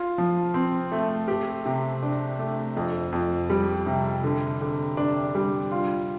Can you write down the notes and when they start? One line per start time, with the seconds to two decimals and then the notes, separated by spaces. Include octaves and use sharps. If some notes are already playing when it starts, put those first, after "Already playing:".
Already playing: F4
0.18 F3
0.54 C4
0.92 A3
1.28 G4
1.65 C3
2.03 D4
2.39 A3
2.77 F2
3.12 F2
3.50 G3
3.86 C3
4.24 D3
4.61 D3
4.97 D4
5.35 G3
5.71 F4